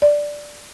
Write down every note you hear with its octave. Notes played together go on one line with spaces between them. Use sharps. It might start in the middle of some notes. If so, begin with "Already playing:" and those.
D5